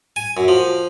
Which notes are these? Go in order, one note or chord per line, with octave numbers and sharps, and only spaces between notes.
G#5
F#2
F3